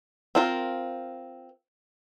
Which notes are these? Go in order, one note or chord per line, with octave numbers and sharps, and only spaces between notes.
C4 F4 A#4